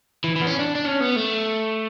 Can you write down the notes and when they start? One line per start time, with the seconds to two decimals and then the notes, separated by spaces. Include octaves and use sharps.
0.24 E3
0.36 E3
0.41 B3
0.47 C#4
0.59 D4
0.75 D4
0.85 C#4
1.00 B3
1.16 A3